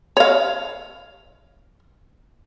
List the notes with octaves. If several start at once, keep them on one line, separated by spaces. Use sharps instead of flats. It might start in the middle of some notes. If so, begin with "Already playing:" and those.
C#5 F5